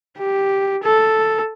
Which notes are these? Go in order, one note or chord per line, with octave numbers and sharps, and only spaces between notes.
G4
A4